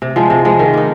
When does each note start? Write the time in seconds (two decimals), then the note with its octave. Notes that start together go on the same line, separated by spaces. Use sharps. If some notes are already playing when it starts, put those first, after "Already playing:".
0.02 C3
0.16 F3 G#3
0.30 C3
0.45 F3 G#3
0.59 D#3
0.74 A#3 D#4